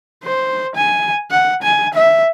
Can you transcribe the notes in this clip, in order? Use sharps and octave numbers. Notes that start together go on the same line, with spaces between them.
C5
G#5
F#5
G#5
E5